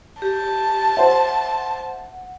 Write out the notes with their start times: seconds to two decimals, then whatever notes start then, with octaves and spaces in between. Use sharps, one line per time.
0.22 G4 A5
0.97 C5 E5 F#5